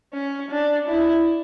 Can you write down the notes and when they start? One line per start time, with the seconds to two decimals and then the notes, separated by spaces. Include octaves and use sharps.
0.13 C#4
0.50 D4
0.88 E4